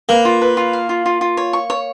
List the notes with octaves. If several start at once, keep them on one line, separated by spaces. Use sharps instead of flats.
A#3 B4
F4
B4
F4
F5
F4
F4
F4
C#5
C#6
C#5